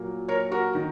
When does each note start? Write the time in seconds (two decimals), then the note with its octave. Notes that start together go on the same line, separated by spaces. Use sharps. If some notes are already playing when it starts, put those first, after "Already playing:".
Already playing: A#2 F#3 A#3
0.28 A#4 C#5
0.52 F#4 A#4
0.75 D#3